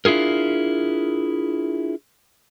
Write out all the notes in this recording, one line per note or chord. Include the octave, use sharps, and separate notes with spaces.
D4 E4 F4 G#4 A#4